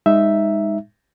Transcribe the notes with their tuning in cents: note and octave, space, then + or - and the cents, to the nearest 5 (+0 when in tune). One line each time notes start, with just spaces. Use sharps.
G#3 -30 D#4 +0 E5 +0